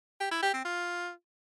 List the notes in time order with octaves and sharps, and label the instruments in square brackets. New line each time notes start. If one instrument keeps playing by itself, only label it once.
[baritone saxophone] G4
E4
G4
C4
F4